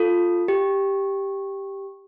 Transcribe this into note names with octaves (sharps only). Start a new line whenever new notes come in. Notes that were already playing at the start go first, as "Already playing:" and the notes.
Already playing: F4 A4
G4